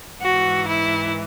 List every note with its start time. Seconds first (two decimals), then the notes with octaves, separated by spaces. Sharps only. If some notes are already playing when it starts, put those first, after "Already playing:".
0.21 G#2 E3 F#4
0.68 E4